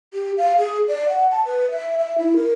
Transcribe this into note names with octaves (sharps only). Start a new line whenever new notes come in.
G4
F5
G#4
D5
F#5
A5
B4
E5
E5
E4
A#4